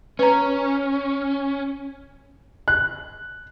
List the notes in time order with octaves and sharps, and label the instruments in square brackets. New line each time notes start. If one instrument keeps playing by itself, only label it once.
[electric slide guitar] C#4 [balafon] B4 A#5
[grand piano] F#6